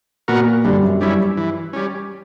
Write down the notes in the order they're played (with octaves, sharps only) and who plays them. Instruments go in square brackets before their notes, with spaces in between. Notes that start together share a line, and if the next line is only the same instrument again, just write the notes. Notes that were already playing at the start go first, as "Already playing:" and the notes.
[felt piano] A#2 [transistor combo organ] B3 F#4 A#4
[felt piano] G2 [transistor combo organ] D3
[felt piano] F#2
[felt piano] G2 [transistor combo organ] G3 C#4 E4
[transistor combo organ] E3
G3 C#4